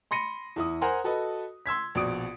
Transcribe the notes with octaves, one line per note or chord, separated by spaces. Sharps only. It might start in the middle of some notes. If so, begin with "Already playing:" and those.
B5 C6 A#6 C#7 D#7
E2 E4 D#6
A#4 C5 F#5 G#5 A#5 C6
F#4 A4 B4 D#5
C6 E6 G#6 B6
A#1 B2 F#4 D5 D#6 D7